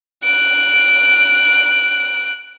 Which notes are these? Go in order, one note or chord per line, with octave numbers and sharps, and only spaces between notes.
F#6 D7